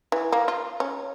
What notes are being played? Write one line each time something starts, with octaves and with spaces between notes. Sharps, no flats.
E3
A#3
F4
C#4